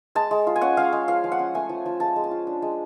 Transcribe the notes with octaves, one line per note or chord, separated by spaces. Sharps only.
G#3 A5
G#3
F4
G#5
C#4 F#5
G#3 F5
G#3
F3 F5
F3
F#5
C#4
A3 G#5
F3
F3
G#3 A5
G#3
A5
F4
D4
G#3